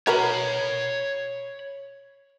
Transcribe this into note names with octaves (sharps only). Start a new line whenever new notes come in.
F#4 A#4 B4 C#5 B5